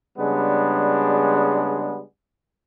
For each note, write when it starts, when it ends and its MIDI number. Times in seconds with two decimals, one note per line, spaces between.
0.19 2.01 49
0.19 2.01 55
0.19 2.01 56
0.19 2.01 59
0.19 2.01 62